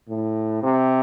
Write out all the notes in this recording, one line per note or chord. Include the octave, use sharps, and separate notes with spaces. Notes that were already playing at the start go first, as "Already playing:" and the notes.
A2
C3